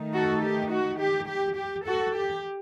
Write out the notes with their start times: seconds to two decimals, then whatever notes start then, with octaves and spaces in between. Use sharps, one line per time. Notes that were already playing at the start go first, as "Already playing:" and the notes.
Already playing: D#3 A3 D#4
0.14 F#4 A4
0.43 G4
0.71 F#4
1.00 G4
1.29 G4
1.57 G4
1.86 F#4 A4
2.15 G4